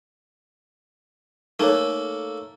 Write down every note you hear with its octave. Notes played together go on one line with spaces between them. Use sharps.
A3 A#3 D#4 A4 C#5